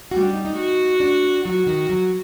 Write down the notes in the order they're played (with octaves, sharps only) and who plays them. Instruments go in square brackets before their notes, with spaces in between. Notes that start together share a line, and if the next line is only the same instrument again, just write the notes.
[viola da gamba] G3 [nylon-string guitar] F#4
[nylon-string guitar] D4
D#4
D#4
[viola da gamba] F#4
[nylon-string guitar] D4
[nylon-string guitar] F#3 [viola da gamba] F#4
[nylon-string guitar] D#3
F#3